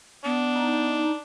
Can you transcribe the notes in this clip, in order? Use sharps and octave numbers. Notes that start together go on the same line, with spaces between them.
B3 D4
D#4